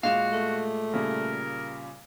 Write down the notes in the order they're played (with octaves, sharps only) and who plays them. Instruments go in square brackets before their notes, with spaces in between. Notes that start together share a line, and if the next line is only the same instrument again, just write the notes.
[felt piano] A#2 G#3 E7 [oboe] F#4 [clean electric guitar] F5
[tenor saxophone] A3
[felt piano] A#2 C#3 G3 [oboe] A#4